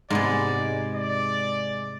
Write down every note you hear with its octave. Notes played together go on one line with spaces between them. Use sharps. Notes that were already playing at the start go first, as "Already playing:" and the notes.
G#2 C3 G#3 B3 D5
D5